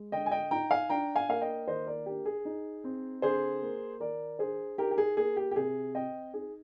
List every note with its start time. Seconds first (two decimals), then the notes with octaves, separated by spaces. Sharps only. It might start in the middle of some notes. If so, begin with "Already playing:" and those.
Already playing: G#3
0.12 D3 D#5 G5
0.26 G#5
0.31 D#5 G5
0.51 D#4 G5 A#5
0.71 F5 G#5
0.90 D4 G5 A#5
1.16 F5 G#5
1.29 A#3 F5
1.41 D#5 G5
1.67 D#3 C5 D#5
1.87 A#4 D5
2.06 D4 G4 A#4
2.26 G#4
2.45 D#4
2.84 C4
3.22 D3 G#4 C5
3.62 A#3
4.00 D#3 A#4 D5
4.39 D4 G#4 C5
4.78 D#4 G4 A#4
4.91 G4
4.98 G#4
5.17 A#3 G#4
5.36 G4
5.51 G4
5.56 C3 G#4
5.95 C4 D#5 G5
6.34 D#4 G#4